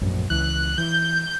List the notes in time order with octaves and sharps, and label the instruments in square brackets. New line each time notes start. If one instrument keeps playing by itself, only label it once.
[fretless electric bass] A#1 F#2 A2
[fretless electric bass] C#2 E3 [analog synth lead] F#6
[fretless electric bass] E3 [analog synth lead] G6